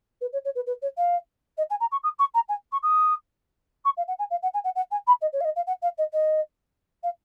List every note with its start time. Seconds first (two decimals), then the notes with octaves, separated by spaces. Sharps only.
0.21 B4
0.32 C#5
0.44 C#5
0.55 B4
0.66 B4
0.81 C#5
0.97 F5
1.57 D#5
1.70 G#5
1.80 A#5
1.91 C#6
2.03 D#6
2.18 C#6
2.34 A#5
2.48 G#5
2.72 C#6
2.82 D#6
3.84 C#6
3.97 F5
4.07 F#5
4.18 G#5
4.30 F5
4.42 F#5
4.53 G#5
4.64 F#5
4.75 F#5
4.90 G#5
5.06 B5
5.21 D#5
5.32 C#5
5.40 F5
5.44 D#5
5.55 F5
5.66 F#5
5.82 F5
5.97 D#5
6.12 D#5
7.03 F5